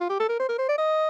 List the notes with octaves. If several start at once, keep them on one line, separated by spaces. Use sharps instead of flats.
F4
G4
A4
A#4
C5
A#4
C5
D5
D#5